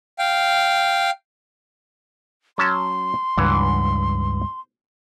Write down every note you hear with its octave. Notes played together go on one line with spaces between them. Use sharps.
F5 G5
F#3 C#4 A5 C6
C#2 G2 E3 F#5